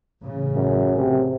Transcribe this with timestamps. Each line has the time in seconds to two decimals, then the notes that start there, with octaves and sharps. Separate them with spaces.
0.22 A1 C#3
0.56 F#2
0.97 C3